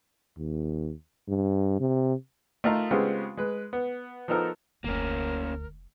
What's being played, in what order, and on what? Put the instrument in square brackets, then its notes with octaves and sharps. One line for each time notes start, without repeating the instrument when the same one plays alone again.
[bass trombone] D#2
G2
C3
[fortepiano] A3 D#4 F4 A#4 D#5 F5
C#3 G#3 B3 C4 F4 G4
G#3 B4
B3
F3 B3 D#4 A4 A#4
[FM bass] F1 [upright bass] D2 [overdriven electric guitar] A#3 C#4 [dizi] A#4